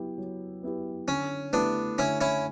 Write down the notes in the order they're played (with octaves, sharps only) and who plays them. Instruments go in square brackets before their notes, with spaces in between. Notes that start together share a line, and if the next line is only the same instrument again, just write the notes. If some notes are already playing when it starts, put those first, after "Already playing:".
Already playing: [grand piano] F#3 B3 E4 G4
F#3
B3 E4 G4
[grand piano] D3 [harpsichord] C#4
[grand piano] A3 E4 G4 [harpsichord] B3 D4
[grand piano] D3 [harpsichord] C#4 E4
[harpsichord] C#4 E4